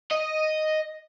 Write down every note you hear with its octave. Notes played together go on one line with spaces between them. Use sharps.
D#5